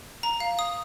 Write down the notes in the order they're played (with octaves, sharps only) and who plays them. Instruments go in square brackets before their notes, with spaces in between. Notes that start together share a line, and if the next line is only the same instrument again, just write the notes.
[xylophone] A#5
F5
D#6